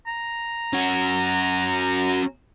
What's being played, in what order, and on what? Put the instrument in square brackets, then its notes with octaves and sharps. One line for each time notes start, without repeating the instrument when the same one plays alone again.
[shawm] A#5
[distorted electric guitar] C#4 F#4